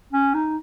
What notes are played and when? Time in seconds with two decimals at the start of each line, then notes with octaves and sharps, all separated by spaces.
0.13 C#4
0.34 D#4